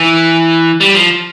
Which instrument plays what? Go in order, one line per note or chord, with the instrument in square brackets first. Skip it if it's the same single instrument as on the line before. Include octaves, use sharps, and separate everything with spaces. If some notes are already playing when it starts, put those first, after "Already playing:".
Already playing: [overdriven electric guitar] E3
G3
F3